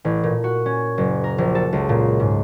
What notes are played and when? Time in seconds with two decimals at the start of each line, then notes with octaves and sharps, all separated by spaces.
0.05 A1
0.23 A#2
0.44 F#4
0.66 C#4
0.98 F#1
1.24 A#4
1.38 A#1
1.55 A4
1.73 C#2
1.89 A#2
2.20 G#2